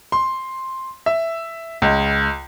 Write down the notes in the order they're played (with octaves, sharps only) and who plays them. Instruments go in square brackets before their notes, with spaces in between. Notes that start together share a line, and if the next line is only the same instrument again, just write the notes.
[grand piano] C6
E5
C#2